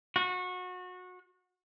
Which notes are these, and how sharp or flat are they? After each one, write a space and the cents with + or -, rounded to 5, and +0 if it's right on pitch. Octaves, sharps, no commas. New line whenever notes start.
F#4 -25